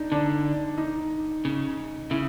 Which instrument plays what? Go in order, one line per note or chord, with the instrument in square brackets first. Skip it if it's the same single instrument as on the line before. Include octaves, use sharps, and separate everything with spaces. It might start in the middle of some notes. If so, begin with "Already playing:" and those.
Already playing: [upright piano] D4 D#4
[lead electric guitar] D3 [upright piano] D4
[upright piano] D#4
[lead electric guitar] C#3
[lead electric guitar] C#3 [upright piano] E4